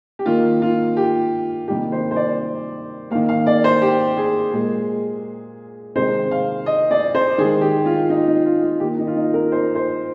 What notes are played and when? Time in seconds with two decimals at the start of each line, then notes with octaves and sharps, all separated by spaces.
0.19 G4
0.26 D#3 A#3 F4
0.62 F4
0.97 G4
1.68 C3 D#3 G3 A#3 G4
1.92 C5
2.11 C5
2.16 D5
3.11 A#3 F5
3.15 D#3
3.29 F5
3.47 D5
3.64 C5
3.82 G4
4.17 G#4
4.53 A#2 G#3
5.95 C3 D#3 G#3 C5
6.31 F5
6.66 D#5
6.91 D5
7.15 C5
7.38 D#3 G#4
7.42 G#3
7.61 G4
7.86 F4
8.10 D#4
8.28 D#4
8.46 F4
8.63 F4
8.80 D#3 A#3 G4
8.99 D#4
9.07 F4
9.16 D#4
9.34 A#4
9.52 C5
9.75 C5